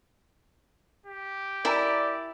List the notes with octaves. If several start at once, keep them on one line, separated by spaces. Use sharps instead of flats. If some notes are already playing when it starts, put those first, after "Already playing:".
G4
E4 A#4 D5 G#5 A#5